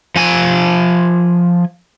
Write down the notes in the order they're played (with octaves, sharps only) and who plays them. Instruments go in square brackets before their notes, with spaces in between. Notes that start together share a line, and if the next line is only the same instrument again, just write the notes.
[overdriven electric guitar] F3 G#5